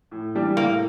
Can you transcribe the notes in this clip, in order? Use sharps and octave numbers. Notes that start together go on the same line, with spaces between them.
A2
E3 G3 D4 G4
A2 A#3